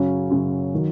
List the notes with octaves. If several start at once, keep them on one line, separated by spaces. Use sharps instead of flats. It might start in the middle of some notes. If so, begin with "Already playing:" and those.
Already playing: F#2 C#3 F#3 C#4
F#2 C#3 F#3 C#4
D#3 F#3